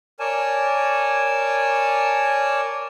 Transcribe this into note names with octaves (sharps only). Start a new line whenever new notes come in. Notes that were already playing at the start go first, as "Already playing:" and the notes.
A#4 C#5 D5 G#5 A5